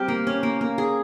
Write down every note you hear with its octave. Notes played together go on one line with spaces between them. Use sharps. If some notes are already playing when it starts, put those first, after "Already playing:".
Already playing: G3 C4 G4 A#4
A#3
C#4
A#3
A#3
G#4